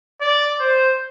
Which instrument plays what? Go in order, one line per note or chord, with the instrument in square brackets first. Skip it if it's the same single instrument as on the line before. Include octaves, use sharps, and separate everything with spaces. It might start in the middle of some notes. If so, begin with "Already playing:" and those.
[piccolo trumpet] D5
C5